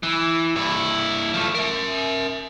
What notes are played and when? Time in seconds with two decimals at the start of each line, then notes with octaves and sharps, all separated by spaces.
0.03 E3
0.56 G2 E4
1.34 F3 A3
1.55 A#4 E5